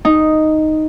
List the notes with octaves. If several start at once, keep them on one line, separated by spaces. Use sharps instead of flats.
D#4